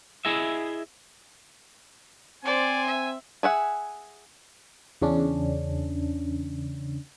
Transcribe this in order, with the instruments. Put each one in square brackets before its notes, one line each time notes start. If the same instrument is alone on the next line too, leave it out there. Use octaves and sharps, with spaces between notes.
[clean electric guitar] E4 G#4 D#5 E5
[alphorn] C4 [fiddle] C5 D5 [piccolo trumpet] G#5
[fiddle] E5
[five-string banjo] G#4 E5 F#5
[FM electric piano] E2 C#3 C#4 D4